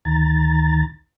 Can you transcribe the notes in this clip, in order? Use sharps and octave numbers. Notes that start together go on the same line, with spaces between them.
D2 D#3 A#5 A6